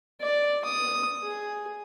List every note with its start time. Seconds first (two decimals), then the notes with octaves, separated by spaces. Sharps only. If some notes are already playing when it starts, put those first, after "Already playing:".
0.21 D5
0.65 D#6
1.23 G#4